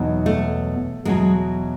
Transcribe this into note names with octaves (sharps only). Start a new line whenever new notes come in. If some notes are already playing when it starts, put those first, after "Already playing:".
Already playing: E2 B2 F#3 D#4
A3
E2 B2 F#3 G#3